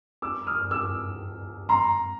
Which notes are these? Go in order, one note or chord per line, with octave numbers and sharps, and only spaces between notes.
D6 E6
D#6 F6
D6 E6
A#5 C6